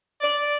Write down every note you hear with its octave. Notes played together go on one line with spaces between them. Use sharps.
D5